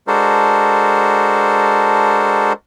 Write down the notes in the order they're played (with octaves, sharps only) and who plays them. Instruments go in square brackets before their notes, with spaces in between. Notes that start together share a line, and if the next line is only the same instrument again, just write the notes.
[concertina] G#3 D4 F#4 A4 A#4 C5